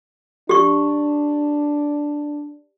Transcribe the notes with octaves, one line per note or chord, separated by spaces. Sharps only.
D4 G4 C#6